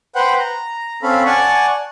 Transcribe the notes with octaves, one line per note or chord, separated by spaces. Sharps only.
B4 C5 F#5 G5
A#5
C4 C#4 A4 F5 B5
D5 F#5 G#5 A5 C#6